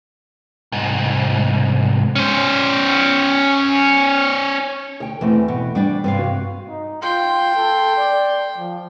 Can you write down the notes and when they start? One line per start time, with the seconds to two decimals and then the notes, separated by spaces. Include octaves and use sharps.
0.72 C2 G#2
2.16 C#4 C5
5.00 D2 G5
5.21 E2 E3 A3 C4
5.48 B2
5.75 G3 D4 D5
6.04 G2 C3 C4 B4 F5
6.19 F#4
6.69 D#4
7.02 F4 G5 C6
7.55 A4
7.96 D5
8.57 F3